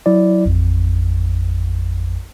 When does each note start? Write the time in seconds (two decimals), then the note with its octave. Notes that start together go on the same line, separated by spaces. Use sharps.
0.06 F#3 E4 D5
0.46 A1 F2